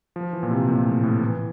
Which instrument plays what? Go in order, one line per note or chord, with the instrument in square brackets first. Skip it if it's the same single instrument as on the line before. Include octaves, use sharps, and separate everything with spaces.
[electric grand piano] F3
E3
A#2
C3
A#2
A2
A2
E3